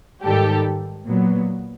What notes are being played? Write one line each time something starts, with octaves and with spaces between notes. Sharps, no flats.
G#2 D#3 G3 G4 A4
A#2 F#3 B3